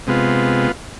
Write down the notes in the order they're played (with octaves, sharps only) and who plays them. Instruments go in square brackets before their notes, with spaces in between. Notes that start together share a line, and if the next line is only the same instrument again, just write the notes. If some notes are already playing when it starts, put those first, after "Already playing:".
[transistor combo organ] C3 G#3 B3 F4